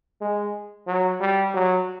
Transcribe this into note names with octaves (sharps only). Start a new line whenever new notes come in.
G#3
F#3
G3
F#3